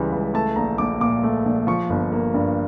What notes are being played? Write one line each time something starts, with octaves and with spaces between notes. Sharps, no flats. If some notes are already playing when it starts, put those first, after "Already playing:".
Already playing: C#2 C#3 E3 G3
C#2
A3 A5
A#1 A#5
A#1 D6
A#2 D6
A3
A#1
F3 C#6
G1
A#3
G2